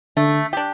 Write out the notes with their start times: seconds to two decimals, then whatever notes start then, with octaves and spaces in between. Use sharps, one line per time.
0.17 D3 A3
0.53 D4 G4